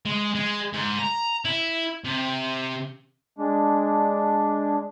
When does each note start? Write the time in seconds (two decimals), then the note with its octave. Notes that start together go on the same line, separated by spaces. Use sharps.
0.06 G#3
0.35 G#3
0.73 G#2
0.98 A#5
1.45 E4
2.05 C3
3.38 G#3 D4